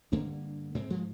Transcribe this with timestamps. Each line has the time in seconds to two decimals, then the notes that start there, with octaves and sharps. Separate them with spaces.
0.12 G2 D3 A#3 D4
0.75 G#2 G#3 C4
0.90 F3 G#3